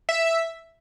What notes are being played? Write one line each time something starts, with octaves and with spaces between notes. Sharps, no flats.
E5